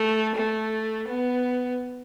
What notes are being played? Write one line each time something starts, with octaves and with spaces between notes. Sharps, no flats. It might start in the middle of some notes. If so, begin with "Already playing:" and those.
Already playing: A3
A3
B3